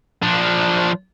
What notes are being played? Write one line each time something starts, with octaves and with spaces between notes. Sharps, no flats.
F3 D4